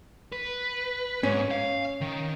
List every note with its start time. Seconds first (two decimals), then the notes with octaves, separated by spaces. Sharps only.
0.32 B4
1.23 G#2 C#4
1.51 F5
2.01 D#3